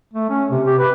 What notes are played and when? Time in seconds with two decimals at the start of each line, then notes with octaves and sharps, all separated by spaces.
0.13 A3
0.30 C#4
0.51 C3
0.67 G4
0.79 B4